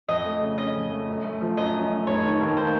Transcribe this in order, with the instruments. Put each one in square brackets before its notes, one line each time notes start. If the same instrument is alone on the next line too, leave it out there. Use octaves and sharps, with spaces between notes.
[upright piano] F2 [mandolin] D#5
[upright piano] A3
C#3
[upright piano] C#4 [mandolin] D#5
[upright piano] F2
A3
F#2
A3
F3
[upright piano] F#2 [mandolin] D#5
[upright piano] F#2
A3
[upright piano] F1 [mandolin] C#5
[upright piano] D#3
D#2
[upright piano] A#3 [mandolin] C5